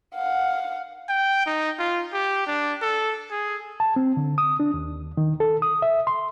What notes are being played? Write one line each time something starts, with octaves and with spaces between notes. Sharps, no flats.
F5 F#5
G5
D#4
F4
G4
D4
A4
G#4
A5
C4
D3
D#6
D4
D#2
D#3
A4
D#6
E5
C6